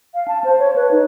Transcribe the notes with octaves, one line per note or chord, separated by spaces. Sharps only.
F5
A5
C5
C#5
B4
D#4